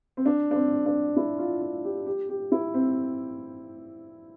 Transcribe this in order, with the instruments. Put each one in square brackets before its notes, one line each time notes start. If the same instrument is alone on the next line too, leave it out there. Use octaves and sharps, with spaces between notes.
[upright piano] C4
D4
D4
C4
D4
E4
F4
F4
G4
G4
G4
E4
C4